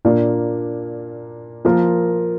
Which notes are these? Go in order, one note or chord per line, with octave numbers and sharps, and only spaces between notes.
A#2 A#3 D4
F3 A#3 F4 A#4